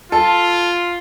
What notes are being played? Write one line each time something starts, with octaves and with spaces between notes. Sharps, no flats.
F4 A4